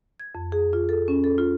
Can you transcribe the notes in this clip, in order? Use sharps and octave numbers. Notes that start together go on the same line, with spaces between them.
G#6
F2
G#4
F4
A4
C#4
A4
F4